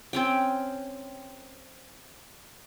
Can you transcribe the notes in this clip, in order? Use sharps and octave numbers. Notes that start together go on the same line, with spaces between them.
C4 C#4 G5